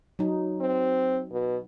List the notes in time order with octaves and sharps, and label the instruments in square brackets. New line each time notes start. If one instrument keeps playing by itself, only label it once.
[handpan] F#3 D#4
[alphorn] C4
B2